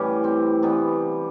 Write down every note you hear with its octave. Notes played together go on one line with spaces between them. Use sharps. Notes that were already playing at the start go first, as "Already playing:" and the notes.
Already playing: A2 E3 G3 C#4 G4
C4
C3 E3 G3 B3